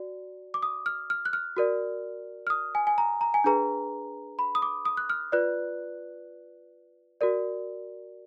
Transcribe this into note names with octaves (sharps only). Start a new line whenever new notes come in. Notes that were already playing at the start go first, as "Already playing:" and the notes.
Already playing: F#4 D5
D6
D#6
F6
F6
F#6
F6
F#4 A#4 D5
F6
D#6
G#5
G#5
A#5
A#5
G#5
D4 G#4 B4 A#5
B5
D#6
D6
D#6
F#6
F6
F4 B4 D5 F#6
F#4 A#4 D5